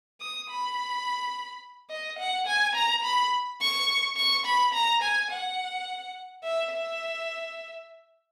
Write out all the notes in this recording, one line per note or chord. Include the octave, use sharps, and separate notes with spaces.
D#6
B5
D#5
F#5
G#5
A#5
B5
C#6
C#6
B5
A#5
G#5
F#5
E5
E5